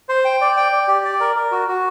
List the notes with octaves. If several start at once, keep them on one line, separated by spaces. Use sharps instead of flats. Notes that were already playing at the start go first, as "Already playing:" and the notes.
C5
G5
D5
G5
D5
G4
D5
A#4
A#4
F#4
F#4